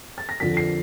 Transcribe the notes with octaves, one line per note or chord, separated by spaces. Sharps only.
A6
A#6
F2 D3 F3 B6
C7